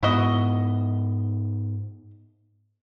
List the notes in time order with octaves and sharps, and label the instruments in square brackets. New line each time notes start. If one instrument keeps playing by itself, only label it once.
[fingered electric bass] G#2 B3 [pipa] E4 F#4 D#5